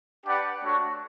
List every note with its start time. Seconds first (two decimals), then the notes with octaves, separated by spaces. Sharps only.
0.25 D4 G4 B4 D5 F#5
0.62 A3 D4 F#4 C#5